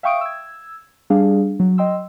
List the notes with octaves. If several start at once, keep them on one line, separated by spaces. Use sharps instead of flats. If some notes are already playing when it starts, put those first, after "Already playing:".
E5 F5 G5 C#6 D#6 D7
E6 G#6
G3 D4 G#4 F5
F#3
D#5 G5 C6 E6